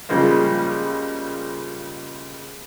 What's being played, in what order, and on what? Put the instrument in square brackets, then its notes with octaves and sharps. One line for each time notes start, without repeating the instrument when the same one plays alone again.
[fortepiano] C#3 F3 G3 G#3 A#3